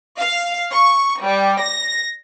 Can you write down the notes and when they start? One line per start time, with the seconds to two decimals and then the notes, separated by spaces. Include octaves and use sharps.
0.20 F5
0.71 C#6
1.23 G3
1.62 A#6